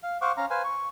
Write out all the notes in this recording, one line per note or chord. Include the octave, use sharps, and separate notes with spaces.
F5
C5 F5 F#5 C#6 D6
C#4 F5 A#5
B4 C5 F5 G#5
C#6